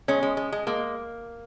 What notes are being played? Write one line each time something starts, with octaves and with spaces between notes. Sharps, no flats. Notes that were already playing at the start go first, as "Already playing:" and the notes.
G#3 C#4
G#3
G#3
G#3
G#3 A#3